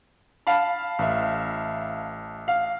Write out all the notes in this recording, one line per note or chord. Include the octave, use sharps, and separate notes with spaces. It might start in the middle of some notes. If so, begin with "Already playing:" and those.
F5 A5 B5
A1 E5
F5